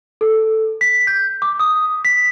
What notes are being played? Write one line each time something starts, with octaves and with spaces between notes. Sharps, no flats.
A4
B6
G6
D6
D#6
B6